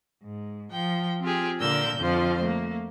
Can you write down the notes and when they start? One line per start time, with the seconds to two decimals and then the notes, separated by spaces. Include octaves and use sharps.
0.24 G#2
0.70 F3 G5
1.21 C4 F4 G4 G#4
1.60 A#2 D3 A#4 D5 E6 G6
1.98 F2 D3 F3 F4 C5
2.42 A3 A#3